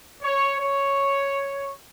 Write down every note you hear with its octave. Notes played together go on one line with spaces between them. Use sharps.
C#5
C#5